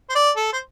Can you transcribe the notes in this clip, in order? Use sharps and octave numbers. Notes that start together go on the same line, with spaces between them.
C5
D5
A4
C5